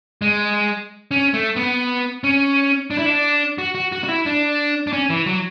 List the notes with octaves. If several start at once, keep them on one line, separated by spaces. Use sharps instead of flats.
G#3
C#4
A3
B3
C#4
D4
E4
D4
F#4
F#4
F#4
F#4
E4
D4
D4
C#4
E3
F#3